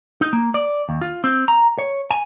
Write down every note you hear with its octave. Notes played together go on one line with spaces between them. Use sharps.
D#4
A#3
D5
D#2
F4
C4
A#5
C#5
G#5